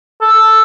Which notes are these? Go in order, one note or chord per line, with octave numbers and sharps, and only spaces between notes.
A4